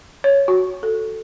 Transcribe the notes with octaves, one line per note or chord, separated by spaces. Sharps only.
C#5
F#4
A4